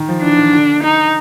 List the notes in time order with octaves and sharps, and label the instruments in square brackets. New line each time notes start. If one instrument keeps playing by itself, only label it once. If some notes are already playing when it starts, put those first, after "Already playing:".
Already playing: [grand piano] D#3
F3
[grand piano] E3 [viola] D4
[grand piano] D#3
D3
[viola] D#4